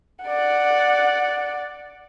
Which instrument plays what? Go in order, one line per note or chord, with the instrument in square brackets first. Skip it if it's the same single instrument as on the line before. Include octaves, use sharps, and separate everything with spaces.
[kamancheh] D5 F#5